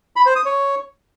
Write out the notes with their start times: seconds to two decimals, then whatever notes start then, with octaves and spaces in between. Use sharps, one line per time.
0.16 B5
0.26 C5
0.36 D#6
0.45 C#5